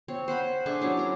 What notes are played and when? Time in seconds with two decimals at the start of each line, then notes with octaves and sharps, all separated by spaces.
0.08 C4 C#5
0.28 C5 F#5 B5
0.66 D4 G#4 A4 E5
0.81 F#3 C#4 D4 E4
0.97 A#4 A#5